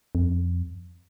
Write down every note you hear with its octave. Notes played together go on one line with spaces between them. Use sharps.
F2